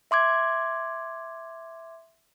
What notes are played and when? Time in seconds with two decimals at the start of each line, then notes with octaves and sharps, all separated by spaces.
0.11 E5 C6 D6 G#6